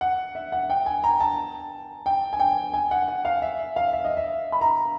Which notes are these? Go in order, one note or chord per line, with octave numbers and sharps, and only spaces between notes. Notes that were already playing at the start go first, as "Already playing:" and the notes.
F#5
E5
F#5
G5
G#5
A#5
A5
G5
G#5
G5
G#5
F#5
F#5
F5
E5
F5
E5
D#5
E5
B5
A#5